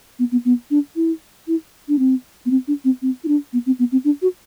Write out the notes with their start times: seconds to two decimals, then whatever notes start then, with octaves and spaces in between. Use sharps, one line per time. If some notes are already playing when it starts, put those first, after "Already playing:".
0.19 B3
0.32 B3
0.45 B3
0.71 D4
0.96 E4
1.48 E4
1.88 D4
1.99 C4
2.46 B3
2.51 C4
2.68 D4
2.84 C4
3.02 C4
3.24 E4
3.28 D4
3.53 B3
3.66 C4
3.79 B3
3.92 C4
4.04 D4
4.22 F#4